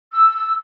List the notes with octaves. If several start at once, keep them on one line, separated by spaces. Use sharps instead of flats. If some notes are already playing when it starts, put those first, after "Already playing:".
E6